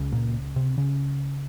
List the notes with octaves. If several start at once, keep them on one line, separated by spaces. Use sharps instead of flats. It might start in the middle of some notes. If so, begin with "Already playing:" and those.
Already playing: C#2 C#3
A#2 A#3
C3 C4
C#3 C#4